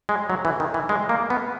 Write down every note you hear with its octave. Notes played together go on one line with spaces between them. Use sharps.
G#3
F#3
E3
D#3
E3
G#3
A#3
B3